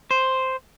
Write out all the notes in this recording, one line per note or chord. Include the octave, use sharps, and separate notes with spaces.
C5